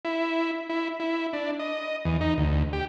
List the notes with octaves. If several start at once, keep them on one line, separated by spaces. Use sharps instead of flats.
E4
E4
E4
D4
D#5
E2
D#4
D2
G4